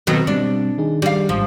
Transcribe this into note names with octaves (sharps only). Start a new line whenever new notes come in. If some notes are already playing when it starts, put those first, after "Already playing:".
B2 D#3 F#3 B3 C4 A4
B2 G3 C4 D4
D#3 D#4 G#4
G3 F5
A1 G#2 F3